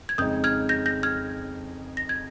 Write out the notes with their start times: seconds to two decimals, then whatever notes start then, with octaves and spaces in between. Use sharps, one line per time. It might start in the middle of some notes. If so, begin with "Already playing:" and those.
0.09 G#6
0.18 F2 C#3 G#3 D#4 D#6 G6
0.44 F6 G#6
0.69 G6 A#6
0.86 G6 A#6
1.03 F6 G#6
1.97 A#6
2.09 G#6